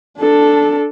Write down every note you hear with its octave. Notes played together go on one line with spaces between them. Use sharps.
D4 A4